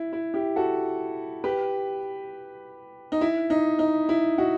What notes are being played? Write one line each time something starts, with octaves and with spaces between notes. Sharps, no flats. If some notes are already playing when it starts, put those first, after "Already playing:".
Already playing: E4
E4
E4 G4
F#4 A4
G4 B4
D#4
E4
D#4
D#4
E4
D#4 F#4